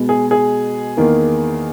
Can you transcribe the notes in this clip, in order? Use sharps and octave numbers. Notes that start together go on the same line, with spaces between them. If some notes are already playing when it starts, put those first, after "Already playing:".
Already playing: B2 G#3 B3
G#4
G#4
E2 D#3 A#3